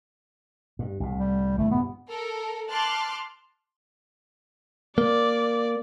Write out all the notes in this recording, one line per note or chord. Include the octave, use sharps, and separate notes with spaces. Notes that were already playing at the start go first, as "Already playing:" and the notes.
G2
C2 A2
G3
G1 E3 A3
G2 A#2 B3
A4 A#4
A5 C6 D6 F6 F#6 A6
A#3 D5